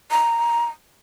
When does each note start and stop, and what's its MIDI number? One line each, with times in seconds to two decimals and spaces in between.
0.11 0.66 82